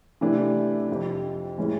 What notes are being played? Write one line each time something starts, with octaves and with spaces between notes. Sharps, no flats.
C3 E3 A3 D4
F2 C3 F3
A2 E3 G#3 C#4